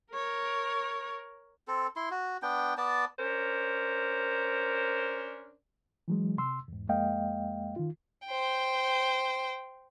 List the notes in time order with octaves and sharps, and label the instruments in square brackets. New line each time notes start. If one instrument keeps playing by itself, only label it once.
[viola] A#4 C#5
[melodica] C4 A4
E4 C6
F#4
B3 D4 G5
B3 D5 A5
[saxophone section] C#4 D4 A#4 C5
[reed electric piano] E3 F#3 G#3
C3 C6 E6
E2 G#2
F2 G#3 A#3 D#5 F5 G5
D#3 F4
[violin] C5 G5